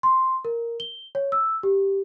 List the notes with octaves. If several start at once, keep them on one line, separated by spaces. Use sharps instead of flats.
C6
A#4
G7
C#5
E6
G4